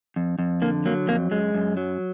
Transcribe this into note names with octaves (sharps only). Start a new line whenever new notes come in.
F2
F2
D3 A#3
F#3 A#3
F2 A#3
F#2 G#3
F#2
F#3